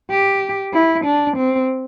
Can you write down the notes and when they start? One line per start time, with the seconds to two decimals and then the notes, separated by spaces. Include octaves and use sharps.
0.10 G4
0.74 E4
1.05 D4
1.37 C4